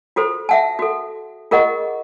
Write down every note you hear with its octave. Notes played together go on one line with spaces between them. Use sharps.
F4 F#4 A4 C5
E5 F#5 A5
F#4 A4
F4 G#4 A#4 D#5 F#5 C#6